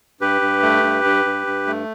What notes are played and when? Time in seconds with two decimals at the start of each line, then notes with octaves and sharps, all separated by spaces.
0.21 G2 G4 B4
0.41 G2
0.63 A3
0.83 G2
1.05 G2
1.25 G2
1.47 G2
1.67 A3